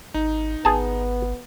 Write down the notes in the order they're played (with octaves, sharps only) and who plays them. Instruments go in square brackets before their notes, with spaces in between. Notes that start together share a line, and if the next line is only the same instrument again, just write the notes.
[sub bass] G#1 [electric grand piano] D#4
[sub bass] G#1 [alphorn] B3 [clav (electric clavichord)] G#4 A5